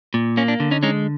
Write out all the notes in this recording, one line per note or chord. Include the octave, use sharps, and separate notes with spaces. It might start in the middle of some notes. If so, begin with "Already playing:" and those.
A#2
A#3 C#4
D4
D3
C#4 D#4
G#3 C#4 D#4